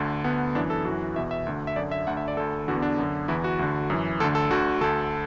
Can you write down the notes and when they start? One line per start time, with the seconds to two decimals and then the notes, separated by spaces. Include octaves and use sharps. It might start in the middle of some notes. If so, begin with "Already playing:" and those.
Already playing: D2 D3
0.24 D2 D3 B3
0.55 F#2 E3 D4
0.70 A4
0.85 F#2 E3 F#4
1.16 E2 B2 E5
1.31 E5
1.46 D2 D3
1.67 E5
1.76 F#2 D3 D5
1.91 E5
2.07 D2 D3 F#5
2.17 E5
2.28 D5
2.37 D2 D3 A4
2.68 E2 D3 F#4
2.76 B3
2.82 D4
2.98 F#2 D3
3.28 E2 E3 E4
3.44 F#4
3.59 D2 D3
3.90 F#2 E3
4.20 D2 D3 A4
4.35 A4
4.50 D2 D3 F#4
4.81 D2 D3 A4